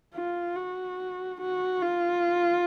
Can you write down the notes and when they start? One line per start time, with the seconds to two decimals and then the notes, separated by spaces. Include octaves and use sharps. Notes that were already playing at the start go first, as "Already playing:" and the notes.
0.15 F4
0.56 F#4
1.40 F#4
1.82 F4